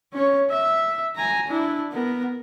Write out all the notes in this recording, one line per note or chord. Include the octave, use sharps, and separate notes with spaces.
C#4 C#5
E5
G#5 A#5
D4 E4
B3 A#4